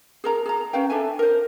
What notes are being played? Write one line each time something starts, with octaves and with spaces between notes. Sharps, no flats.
G#4 A#4 A#5
G#4 A#5
C#4 B4 F5 G5
D4 A4 E5 G#5
A#4 C5